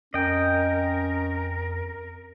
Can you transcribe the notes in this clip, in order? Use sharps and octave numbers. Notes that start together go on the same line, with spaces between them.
F2 C#4 A#4 D#5 G5